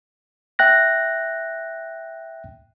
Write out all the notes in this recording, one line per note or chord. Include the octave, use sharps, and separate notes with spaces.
E5 G5 F#6 A#6